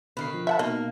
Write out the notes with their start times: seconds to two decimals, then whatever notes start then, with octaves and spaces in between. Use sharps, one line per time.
0.17 B2 D3 D#3 B4 C7
0.34 F3
0.47 E5 F#5 A5
0.59 B2 A#3 D#4 D#5